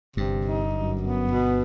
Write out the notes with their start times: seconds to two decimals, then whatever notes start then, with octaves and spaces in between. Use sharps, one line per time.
0.17 G1 G2 C3
0.45 D#4
0.74 F#2
1.01 B3
1.30 B2